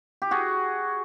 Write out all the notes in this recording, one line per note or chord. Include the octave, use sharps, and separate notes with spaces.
G4
F#4 G#4